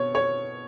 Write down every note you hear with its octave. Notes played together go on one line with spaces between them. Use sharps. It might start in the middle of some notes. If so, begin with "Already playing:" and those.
Already playing: B2 C#5
C#5